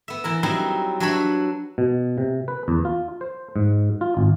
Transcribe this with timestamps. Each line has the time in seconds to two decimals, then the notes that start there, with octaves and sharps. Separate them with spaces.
0.08 B3 E5
0.24 E3 E4 A#4
0.43 F#3 G3 C4 D#4 E4
1.00 F#3 D4 B4 C#5 E5 B5
1.78 B2
2.18 C3
2.48 B4
2.68 E2
2.85 F4
3.21 C5
3.56 G#2
4.01 F4
4.17 G#1